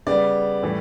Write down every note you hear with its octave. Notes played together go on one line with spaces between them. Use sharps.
C#3 G3 B3 D5
A2 E3 G3